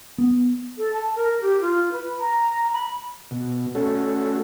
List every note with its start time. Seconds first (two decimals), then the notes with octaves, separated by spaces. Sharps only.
0.18 B3
0.78 A4
0.94 A5
1.16 A#4
1.42 G4
1.61 F4
1.92 B4
2.20 A#5
2.73 B5
3.31 B2
3.75 A3 C#4 F#4 A4